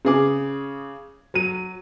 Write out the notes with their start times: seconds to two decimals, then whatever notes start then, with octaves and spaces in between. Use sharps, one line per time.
0.05 C#3 G#4 D6
1.34 F#3 D#7